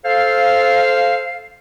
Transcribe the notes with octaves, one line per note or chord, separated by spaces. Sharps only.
A4 C5 F5